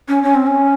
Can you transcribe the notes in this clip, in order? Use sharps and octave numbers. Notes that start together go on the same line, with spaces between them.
C#4
C#4
C4
C#4